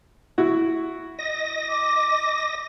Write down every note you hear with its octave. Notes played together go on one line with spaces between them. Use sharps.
E4 F#4
D#5 A#6
D6